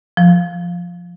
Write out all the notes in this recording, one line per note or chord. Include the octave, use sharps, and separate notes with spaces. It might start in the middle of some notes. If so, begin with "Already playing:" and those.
F3